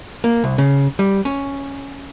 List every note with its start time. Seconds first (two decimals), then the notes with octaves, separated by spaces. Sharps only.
0.24 A#3
0.44 C2
0.58 C#3
0.99 G3
1.25 C#4